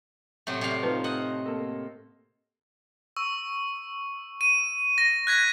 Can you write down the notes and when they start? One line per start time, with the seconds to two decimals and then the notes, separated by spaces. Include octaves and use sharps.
0.47 A2 C3 F#3
0.61 C3 D5 F5
0.83 F3 D#4 B4
1.04 D#5 F#5
1.46 A#3 A4
3.16 C#6 E6
4.41 D#7
4.98 A#6
5.27 F#6 G#6 B6